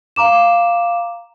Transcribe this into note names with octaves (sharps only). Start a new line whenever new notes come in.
F5 A#5 D6 E7